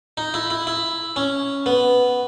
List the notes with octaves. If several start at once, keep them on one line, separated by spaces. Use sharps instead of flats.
D#4
E4
E4
E4
C#4
B3